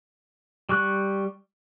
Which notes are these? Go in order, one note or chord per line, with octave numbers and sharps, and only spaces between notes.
G3 C#6 F#6